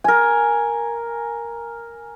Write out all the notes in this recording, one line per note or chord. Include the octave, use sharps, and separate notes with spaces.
A#4 G#5